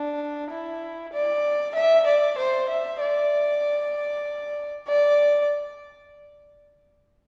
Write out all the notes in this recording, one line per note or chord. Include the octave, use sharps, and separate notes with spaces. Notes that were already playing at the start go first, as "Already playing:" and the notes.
Already playing: D4
E4
D5
E5
D5
C5
E5
D5
D5